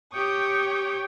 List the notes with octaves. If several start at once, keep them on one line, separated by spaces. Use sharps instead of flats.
G4 C#5 G5 C#6 D#6